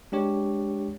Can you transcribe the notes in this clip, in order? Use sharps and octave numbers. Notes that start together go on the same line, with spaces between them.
G#3 D4 G4 C#5